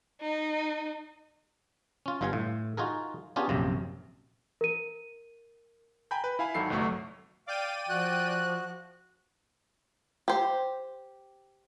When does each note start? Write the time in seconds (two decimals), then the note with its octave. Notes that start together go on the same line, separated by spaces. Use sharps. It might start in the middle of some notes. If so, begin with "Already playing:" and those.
0.21 D#4
2.06 C#4 F4
2.21 G1 G2 F4 F5 G#5
2.33 A2
2.77 D#4 F4 F#4 G#4 A#4
3.36 B3 C#4 D4 F4 G4 G#4
3.49 A#1 F#2 C3
4.61 A#4 D#7
6.11 G5 G#5 A#5 B5 G6
6.24 B4
6.39 E4 F5 G#5 B5
6.55 G#1 D#3 F#3 A4 C7
6.70 G1 C2 F#3 A3 C#6
7.47 D5 F5 G5 D6 D#7
7.89 F3 F#4 F#6
10.28 G4 C5